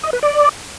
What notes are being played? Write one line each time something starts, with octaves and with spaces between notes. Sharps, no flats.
D#5
B4
D5